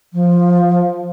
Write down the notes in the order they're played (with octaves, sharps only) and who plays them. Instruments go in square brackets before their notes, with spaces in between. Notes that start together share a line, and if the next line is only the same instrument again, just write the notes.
[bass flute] F3